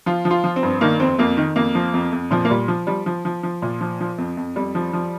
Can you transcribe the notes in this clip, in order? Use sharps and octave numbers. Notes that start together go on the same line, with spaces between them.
F3 F4
F3
F4
F3
C4
G2
D#3 A#3
F2 C4
F2 A#3
D#3
F2 A#3
F3
F2
F2
A#2 F3
A#3
A#2 G3
F3
F3 G3
F3
F3
F3
A#2
F3
F3
F2
F2
F2 G3
F3
F3